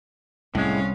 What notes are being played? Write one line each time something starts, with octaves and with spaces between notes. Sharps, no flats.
C2 A2 G#3 C#4 F5